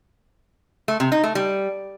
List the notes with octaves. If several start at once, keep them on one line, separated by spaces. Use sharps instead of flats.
A3
C3
D#4
A3
G3